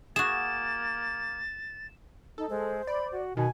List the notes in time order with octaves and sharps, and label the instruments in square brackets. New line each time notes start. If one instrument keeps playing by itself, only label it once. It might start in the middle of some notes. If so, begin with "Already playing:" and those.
[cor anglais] A#3 [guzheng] F#4 G#4 [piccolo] A6 [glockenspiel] E7
[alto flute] D#4 [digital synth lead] A4
[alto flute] G#3 [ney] C5
[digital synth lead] D5 [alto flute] B5
[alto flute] F#4
[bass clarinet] B2 [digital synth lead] D#3 [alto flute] G#5